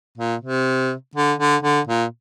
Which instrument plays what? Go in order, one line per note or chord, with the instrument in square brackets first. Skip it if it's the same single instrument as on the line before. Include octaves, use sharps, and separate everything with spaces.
[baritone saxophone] A#2
C3
D3
D3
D3
A#2